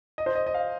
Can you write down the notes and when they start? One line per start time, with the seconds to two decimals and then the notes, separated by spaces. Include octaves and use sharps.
0.18 D#5
0.26 C5
0.36 D#5
0.47 D#5
0.54 F5